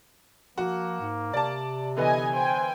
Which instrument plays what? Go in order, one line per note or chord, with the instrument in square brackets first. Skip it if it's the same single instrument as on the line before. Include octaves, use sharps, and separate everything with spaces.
[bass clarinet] F3 [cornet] A#3 [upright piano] F#4
[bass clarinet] G#2
[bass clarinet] C3 [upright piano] D5 A5
[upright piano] D3 E3 B3 [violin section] D#5 G#5
[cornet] C5 [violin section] G5 G#5